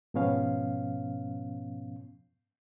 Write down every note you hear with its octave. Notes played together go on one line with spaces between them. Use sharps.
G#2 B2 F3 B3 C#4 F5